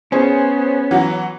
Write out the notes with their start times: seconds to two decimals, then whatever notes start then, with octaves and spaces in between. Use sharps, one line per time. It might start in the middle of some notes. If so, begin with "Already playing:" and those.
0.12 B3 C#4 G#4 C5 C#5
0.91 E3 F#3 F#4 F#5